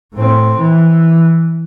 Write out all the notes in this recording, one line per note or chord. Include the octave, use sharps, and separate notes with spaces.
A2 C4
E3